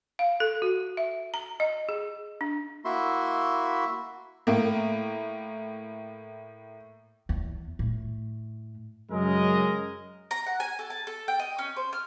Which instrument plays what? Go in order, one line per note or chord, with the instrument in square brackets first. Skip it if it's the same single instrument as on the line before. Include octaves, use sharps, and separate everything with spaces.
[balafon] F5
A4
F#4
E5
A#5
D#5
G#4
D4
[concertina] A#3 E4 F#4 E5 C6
[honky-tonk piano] A2 A#3
[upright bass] E2
A2
[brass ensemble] F#2 C#3 G#3 A#4 D#5
[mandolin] A#5
F#5
G#5
A4
A5
A4
G5
D#5
C#4
C5
F6